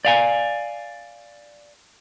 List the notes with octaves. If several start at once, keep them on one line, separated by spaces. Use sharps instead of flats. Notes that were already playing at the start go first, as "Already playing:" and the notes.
D5 F5 G#5